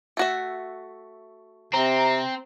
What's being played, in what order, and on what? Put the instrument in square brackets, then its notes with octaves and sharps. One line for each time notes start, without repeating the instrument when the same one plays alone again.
[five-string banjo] A3 F#4 E5
[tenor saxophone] C3 [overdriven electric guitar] C4 [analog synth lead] A#5